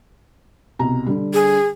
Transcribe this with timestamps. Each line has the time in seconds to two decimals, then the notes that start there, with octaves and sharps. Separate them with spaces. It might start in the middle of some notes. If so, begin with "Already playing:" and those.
0.79 C2 B2 A#5
1.06 D3 G3
1.34 G#4